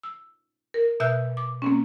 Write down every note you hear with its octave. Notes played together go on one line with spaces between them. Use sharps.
E6
A#4
B2 E5 E6 F#6 G6
D6
A#3 C4 C#4